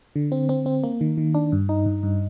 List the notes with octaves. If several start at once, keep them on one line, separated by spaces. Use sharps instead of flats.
D3
C4
C4
C4
A#3
D#3
D#3
D4
G2
D#4
G2
G2